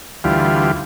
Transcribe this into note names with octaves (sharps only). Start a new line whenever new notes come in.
D2 E3 G3 F4